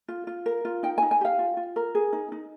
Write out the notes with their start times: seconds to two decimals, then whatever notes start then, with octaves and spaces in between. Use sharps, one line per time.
0.08 F4
0.27 F4
0.46 A#4
0.65 F4
0.83 D#4 G5
0.98 G#5
1.02 D#4
1.11 G#5
1.21 G4 F5
1.39 F4
1.57 F4
1.76 A#4
1.95 G#4
2.13 D#4
2.32 D#4